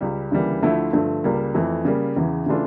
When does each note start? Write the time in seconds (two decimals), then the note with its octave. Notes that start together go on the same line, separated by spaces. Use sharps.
0.01 C#2 C#3 G3
0.31 D2 C#3 E3 G3 A#3
0.62 D2 D3 F3 A3 E4
0.93 G2 D3 F3 A3
1.24 C#2 C#3 G3 A#3
1.54 F2 E3 A3
1.85 C#3 G3 A#3
2.16 E2 C#3 E3
2.46 C#3 E3 A3 D4 F4